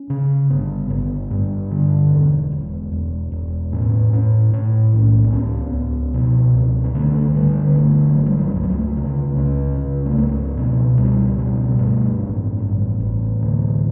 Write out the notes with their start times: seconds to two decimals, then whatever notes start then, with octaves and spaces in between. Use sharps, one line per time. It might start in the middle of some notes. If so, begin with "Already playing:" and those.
Already playing: C#4
0.10 C#3
0.50 G1 B3
0.90 G1
1.31 G2
1.71 D3
2.11 E1
2.52 E1
2.92 E1
3.32 E1
3.72 A2 C#4
4.13 A2
4.53 A2
4.93 B1
5.24 C#4
5.33 C#2 B3
5.74 C#2
6.14 B2
6.54 C#2
6.84 B3
6.94 D3 A3
7.35 D3 G3
7.67 B3
7.75 G1 A3
8.16 G1 F#3
8.26 G3
8.37 F#3
8.56 C#2 A3
8.63 B3
8.70 A3
8.97 C#3
9.37 C#2 C#4
9.77 C#3
10.06 A3
10.17 C#2 B3
10.57 B2
10.98 C#2 G3
11.38 B2
11.79 G2
12.19 A1
12.59 A1
13.00 A1
13.40 D2